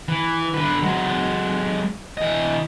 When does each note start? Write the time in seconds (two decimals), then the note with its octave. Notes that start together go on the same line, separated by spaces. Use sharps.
0.08 E3
0.54 D3 B4
0.82 F#3 G#3
2.17 E3 D#5